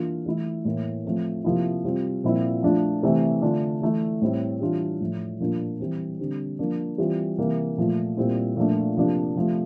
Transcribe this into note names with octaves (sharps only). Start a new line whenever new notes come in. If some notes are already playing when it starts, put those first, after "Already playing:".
Already playing: E3 A#3 D4 F4
E3 A3 E4
A2 E3 A#3
F3 A3 C4
C3 F3 A#3 E4
C3 G3 C4 F4
A#2 F3 C4 E4
F3 A3 D4 F4
C3 E3 A3 C4
D3 A3 D4 F4
E3 A3 E4
A2 G3 C4 E4
E3 G3 D4 F4
A2 F3 A3
A#2 F3 A#3 D4 F4
E3 G3 C4
D3 G3 C4
F3 A#3 D4
E3 G3 C4 F4
C3 E3 A#3
A#2 F3 A3
A#2 G3 C4 E4
A#2 F3 A3 D4
C3 F3 A#3 D4
C3 F3 A3